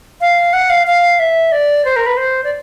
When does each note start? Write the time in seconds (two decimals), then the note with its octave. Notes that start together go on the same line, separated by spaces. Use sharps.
0.21 F5
0.53 F#5
0.70 F5
0.87 F5
1.19 E5
1.52 D5
1.85 C5
1.96 A#4
2.06 B4
2.17 C5
2.44 D5